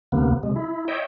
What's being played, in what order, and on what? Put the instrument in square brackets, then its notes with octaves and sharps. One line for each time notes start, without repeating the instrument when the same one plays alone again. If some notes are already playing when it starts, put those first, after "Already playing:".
[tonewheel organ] D2 C3 A#3 B3
C3 G#3
E4
C#5 D#5 E5 G5